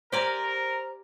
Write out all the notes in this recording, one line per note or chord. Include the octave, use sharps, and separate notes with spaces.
G4 A#4 C5 D5 G#5 A#5